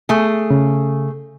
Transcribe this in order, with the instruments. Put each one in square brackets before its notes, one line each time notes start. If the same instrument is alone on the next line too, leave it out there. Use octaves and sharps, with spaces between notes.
[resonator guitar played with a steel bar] A3 G#4
[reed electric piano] C#3